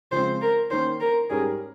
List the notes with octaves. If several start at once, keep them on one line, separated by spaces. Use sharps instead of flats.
C#3 F3 G#3 C4 C5
A#4
D#3 A#3 C#4 C5
A#4
G#2 G3 C#4 G4 G#4 A#4